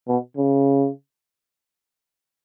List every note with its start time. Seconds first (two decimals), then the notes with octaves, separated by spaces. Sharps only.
0.08 B2
0.37 C#3